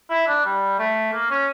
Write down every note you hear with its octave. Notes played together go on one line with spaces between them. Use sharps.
E4
D4
G3
A3
A#3
C#4